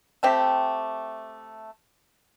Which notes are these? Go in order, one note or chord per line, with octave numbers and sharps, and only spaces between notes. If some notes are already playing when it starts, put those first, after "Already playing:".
A3 C4 G4 E5